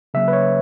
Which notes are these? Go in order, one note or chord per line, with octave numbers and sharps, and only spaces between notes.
C#3 F#3 A#3 C#4 E5
B4
C#5